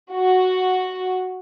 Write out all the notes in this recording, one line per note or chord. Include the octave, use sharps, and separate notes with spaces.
F#4